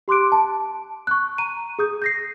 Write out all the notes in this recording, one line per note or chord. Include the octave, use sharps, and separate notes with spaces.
G4 C6 D6 F#6 D7
A5
C#6 F#6
A#5 D#7
G#4 D#6 G6
G6 A#6 C7